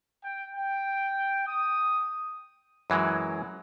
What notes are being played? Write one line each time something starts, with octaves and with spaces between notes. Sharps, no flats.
G5
G5
D#6
F#2 E3 F#3 G#3